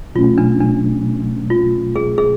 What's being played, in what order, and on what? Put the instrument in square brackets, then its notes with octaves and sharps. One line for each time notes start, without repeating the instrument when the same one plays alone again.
[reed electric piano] B2 F#3 A3 C#4 [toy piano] F4
[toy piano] D4
D4
F4
G#4
G#4